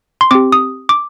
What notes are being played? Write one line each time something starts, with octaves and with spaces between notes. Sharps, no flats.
C6
C4 G4 D6
D#6
D6